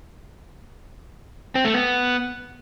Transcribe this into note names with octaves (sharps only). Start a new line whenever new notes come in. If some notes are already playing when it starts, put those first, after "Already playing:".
C4
A3
B3